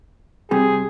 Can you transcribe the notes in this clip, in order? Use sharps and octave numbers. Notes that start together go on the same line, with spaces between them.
C3 G3 G#4